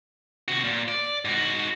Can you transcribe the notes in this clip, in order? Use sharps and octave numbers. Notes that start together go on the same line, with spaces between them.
C3 F#4
A#2
D5
G#2 F#4